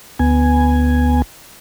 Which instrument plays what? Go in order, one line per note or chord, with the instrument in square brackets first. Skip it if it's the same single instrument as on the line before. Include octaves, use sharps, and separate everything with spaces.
[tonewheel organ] D2 B3 G#5